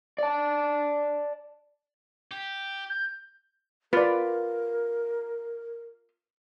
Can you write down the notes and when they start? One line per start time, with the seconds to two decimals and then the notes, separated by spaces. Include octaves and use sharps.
0.18 D5 A5
2.31 G4
2.90 G6
3.93 F4 A#4 B4 D5